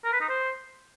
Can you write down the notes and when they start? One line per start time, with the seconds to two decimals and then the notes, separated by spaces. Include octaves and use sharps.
0.04 A#4
0.12 B4
0.21 D#4
0.29 C5